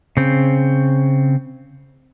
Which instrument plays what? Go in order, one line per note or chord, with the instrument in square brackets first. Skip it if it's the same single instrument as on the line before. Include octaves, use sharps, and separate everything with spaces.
[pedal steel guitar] C#3 C4